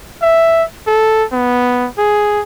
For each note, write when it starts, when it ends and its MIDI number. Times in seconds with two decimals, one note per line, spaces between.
0.22 0.63 76
0.87 1.24 69
1.32 1.87 59
1.98 2.41 68